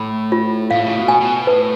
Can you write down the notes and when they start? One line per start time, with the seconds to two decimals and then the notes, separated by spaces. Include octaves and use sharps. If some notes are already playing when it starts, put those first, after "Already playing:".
Already playing: A2 B5
0.32 F4
0.71 A2 F5
0.85 C#3
0.96 B2
1.08 G#5
1.21 B2
1.47 A2 B4